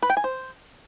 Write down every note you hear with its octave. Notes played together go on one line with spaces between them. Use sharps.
B4
G5
G#5
C5